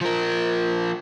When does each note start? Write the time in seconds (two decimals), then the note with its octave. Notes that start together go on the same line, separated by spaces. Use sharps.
0.01 F3 A#4